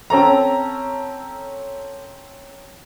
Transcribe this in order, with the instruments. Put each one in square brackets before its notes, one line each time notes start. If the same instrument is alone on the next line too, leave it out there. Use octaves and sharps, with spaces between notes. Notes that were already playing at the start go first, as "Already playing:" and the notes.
[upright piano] C4 C#4 A4 A#5